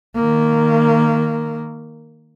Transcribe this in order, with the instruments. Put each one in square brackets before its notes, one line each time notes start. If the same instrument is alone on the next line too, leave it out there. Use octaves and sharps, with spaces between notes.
[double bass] D#3 A#3